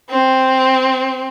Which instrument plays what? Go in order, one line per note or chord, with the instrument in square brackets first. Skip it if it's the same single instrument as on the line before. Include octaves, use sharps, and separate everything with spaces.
[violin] C4